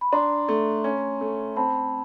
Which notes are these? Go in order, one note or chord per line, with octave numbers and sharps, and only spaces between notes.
B5
D4 A#5 C6
A3
C#4
A3
C4 A5 B5